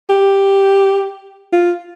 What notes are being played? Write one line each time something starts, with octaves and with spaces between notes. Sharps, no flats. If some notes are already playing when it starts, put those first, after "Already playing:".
G4
F4